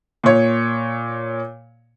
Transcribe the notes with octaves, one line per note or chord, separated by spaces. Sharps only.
A#2 C#5